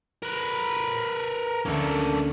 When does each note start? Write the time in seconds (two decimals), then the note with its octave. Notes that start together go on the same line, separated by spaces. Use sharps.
0.22 A#4 B4
1.66 D2 A#3 C#4 A4